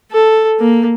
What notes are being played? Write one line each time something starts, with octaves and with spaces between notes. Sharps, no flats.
A4
A#3